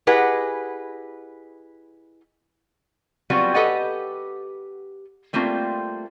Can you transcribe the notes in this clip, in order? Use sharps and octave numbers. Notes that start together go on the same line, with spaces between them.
E4 G4 G#4 B4 D#5 F#5
F#3 G3 B3 C4 F4 F#4
G4 A4 B4 D#5 F#5 G#5
G3 A3 A#3 C4 F4